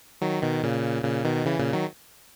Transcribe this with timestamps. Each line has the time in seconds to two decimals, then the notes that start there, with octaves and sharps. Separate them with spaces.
0.21 D#3 F#3
0.43 B2 D#3
0.63 A#2 C#3
1.04 A#2 C#3
1.25 B2 D#3
1.45 C#3 E3
1.59 A#2 C#3
1.73 D#3 F#3